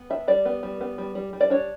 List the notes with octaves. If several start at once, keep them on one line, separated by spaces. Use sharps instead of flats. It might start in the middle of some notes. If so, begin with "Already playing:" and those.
Already playing: B3
D4 E5
G3 D5
B3
G3
B3
G3
G3
G3
D5
D4 C#5